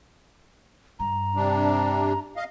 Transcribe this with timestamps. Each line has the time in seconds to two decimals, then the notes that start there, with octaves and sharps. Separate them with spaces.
0.99 G2 A#5
1.36 C3 G3 D4
2.36 D#5 F5